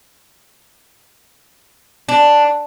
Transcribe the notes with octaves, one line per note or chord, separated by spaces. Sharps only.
D4